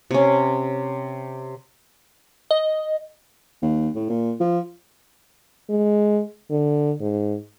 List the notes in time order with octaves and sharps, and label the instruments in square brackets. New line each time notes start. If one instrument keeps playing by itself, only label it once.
[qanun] C3 C#4
[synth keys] D#5
[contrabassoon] D#2
A2
A#2
F3
[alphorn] G#3
D3
G#2